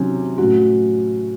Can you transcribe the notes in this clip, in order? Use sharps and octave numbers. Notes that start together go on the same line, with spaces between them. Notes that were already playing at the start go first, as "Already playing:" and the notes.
Already playing: C3 D#3 F#3 C#4
A2 F#3 C#4 F#4